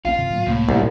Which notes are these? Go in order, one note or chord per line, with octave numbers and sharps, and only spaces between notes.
A#1 C4 F4 F5
G#2 C3 D#3
A2 F#3 B3
C#2 A2 C3 A#3
C2 B2